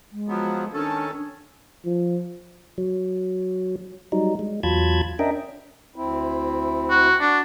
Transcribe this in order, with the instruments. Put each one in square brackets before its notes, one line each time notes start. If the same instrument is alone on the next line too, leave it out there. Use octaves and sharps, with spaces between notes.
[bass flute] G#3
[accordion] F3 F#3 B3
[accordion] D#3 C#4 A4 [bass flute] D4
[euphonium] F3
[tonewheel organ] F#3
F#3 G3 D#4
G#3
E2 F#3 F4 A5 B5 G#6
C#4 D4 A#4 D#5 E5 G5
[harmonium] D2 C4 E4
[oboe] F#4
[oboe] D4 [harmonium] F#4